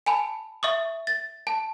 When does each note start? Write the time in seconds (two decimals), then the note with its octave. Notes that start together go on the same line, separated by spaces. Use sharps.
0.06 G#5 A5 B5
0.63 E5 C#6 D#6
1.07 A6
1.47 A5